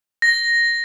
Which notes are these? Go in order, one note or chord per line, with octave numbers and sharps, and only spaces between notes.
A#6